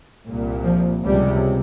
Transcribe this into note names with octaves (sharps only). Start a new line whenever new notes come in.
C2 A#2
F3
C#2 C3 G3